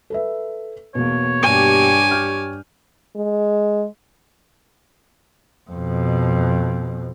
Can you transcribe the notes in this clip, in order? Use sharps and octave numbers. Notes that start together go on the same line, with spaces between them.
A4 B4 E5
E2 B2 A#3 C#5
G2 G4 G#5 D6
F6 G6
G#3
F2 B2